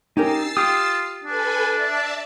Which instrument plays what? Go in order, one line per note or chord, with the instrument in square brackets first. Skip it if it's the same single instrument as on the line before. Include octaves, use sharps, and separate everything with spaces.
[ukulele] C#4 G4 A#4 [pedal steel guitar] D#4 [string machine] E6 A6 C7
[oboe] F4 [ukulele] G4 [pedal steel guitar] D#6
[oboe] D4 [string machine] A4 B4 G#5
[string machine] D5 E5 A5